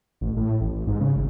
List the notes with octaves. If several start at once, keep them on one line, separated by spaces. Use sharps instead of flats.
A1
A2
A1
G#2
C#3
G#1